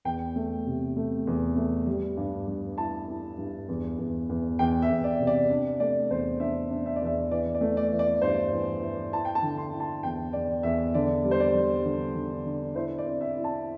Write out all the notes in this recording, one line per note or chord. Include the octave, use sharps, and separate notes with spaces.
E2 G5
A3
C3
A3
E2
A3
G3
G2
G2
E4 A5
E4
G2
E2
E2
E2
E2 G5
E5
E2
D5
C3
D5
D4
A3 D5
E2 C5
D4 E5
D4
E5
D5
E2 E5
E3 D5
D5
A3
D5
E3
D5
G2 C5
E3
E3
E4 A5
G5
A5
D3
C6
E4
A5
E2 G5
E2 D5
E2 E5
D3 D5
G3
C5
D5
G3
D3
D3
D3
E4 C5
D5
C4
E5
E4
A5